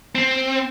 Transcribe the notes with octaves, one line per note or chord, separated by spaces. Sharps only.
C4